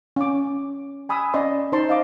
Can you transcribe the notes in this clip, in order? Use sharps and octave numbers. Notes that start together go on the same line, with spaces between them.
C#4 D6
G#5 B5 D#6 E6
C#4 D5 D#5 C6
D#4 C5 D#5 A5 C6
D#5 F5 D6